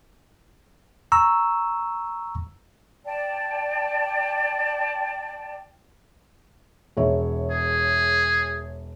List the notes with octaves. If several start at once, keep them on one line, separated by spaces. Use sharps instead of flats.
A#5 C#6 E6
D5 G5 A5
E1 C#5 E5
G#4